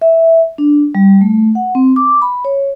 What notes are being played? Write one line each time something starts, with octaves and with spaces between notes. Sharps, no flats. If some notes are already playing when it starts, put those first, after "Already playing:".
E5
D4
G3
A3
F#5
C4
D6
B5
C#5